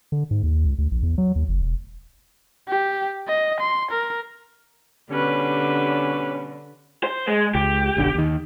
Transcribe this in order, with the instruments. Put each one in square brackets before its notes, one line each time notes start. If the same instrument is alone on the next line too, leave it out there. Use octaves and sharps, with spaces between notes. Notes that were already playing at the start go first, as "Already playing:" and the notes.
[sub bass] D3
G#2
D#2
C#2
D2
A#1
E2
F#3
D#2
F#1
E1
[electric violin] G4
D#5
C6
A#4
[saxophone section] B2 G3 C#4 [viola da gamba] D3 [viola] G4 B4
[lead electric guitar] C5
G#3
[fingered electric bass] C#2 [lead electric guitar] G4
[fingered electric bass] F#1 B1 D3
D#2 D#3